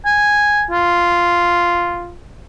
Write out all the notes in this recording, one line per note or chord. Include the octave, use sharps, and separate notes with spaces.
G#5
F4